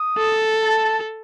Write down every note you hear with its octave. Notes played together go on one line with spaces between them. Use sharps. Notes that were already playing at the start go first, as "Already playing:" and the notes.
Already playing: D#6
A4
A5